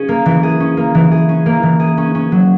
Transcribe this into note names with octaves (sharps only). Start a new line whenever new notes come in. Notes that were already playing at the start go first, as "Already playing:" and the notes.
Already playing: C#4 G#4
A#3
E3
G#4
C#4
A#3
E3
G#4
C#4
A#3
E3
G#4
C#4
C#4
F#3